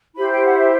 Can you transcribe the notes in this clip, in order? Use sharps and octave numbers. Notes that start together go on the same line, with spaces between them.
E4 G4 C5 B5
G5
F#5
E5